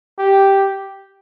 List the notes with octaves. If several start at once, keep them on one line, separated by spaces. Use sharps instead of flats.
G4